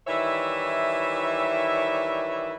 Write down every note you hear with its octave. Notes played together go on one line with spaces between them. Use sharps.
D#3 E3 G3 E4 C#5 E5